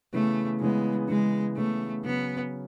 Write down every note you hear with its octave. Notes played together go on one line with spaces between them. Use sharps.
C#3 E3 A3 B3
C#3 E3 G#3 B3
C#3 E3 G#3 B3
C#3 E3 A3 B3
C#3 F#3 B3 C#4